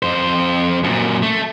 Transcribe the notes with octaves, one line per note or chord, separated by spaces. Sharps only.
F2 C5
F#2 A#2
A3